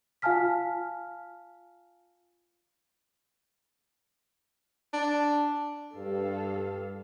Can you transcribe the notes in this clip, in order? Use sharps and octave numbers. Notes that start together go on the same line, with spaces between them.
F4 F5 G#5 A5 F6 B6
D4
G2 A4 F5